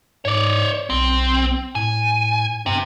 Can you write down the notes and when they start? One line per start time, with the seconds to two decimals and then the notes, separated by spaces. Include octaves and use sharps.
0.25 G#2 C#5 D5
0.90 B1 C4
1.75 A2 G#5
2.66 G2 C3